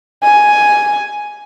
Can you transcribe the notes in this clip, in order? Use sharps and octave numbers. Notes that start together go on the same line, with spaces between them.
G#5